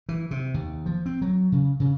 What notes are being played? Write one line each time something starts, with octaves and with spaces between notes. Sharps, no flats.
E3
C3
D#2
F3
C4
F#3
C#3
C#3